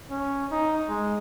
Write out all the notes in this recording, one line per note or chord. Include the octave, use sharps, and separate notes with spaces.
C#4
D#4
G#3